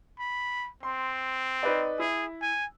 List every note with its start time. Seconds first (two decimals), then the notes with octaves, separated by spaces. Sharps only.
0.19 B5
0.83 C4 C6
1.63 D#4 B4 D5
1.99 E4 G#4
2.42 G#5